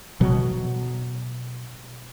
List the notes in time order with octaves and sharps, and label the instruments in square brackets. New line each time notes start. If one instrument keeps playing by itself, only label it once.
[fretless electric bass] B2 F#3